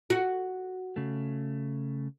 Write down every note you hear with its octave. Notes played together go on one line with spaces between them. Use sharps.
F#4
C#3 A3